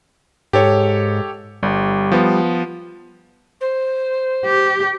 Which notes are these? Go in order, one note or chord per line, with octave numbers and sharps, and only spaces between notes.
G#2 G4 A4 C#5
G1 G3
F3 B3
C5
G4